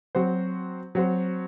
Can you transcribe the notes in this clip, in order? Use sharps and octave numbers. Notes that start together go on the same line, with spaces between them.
F#3 C4 F#4 C5
F#3 C4 F#4 C5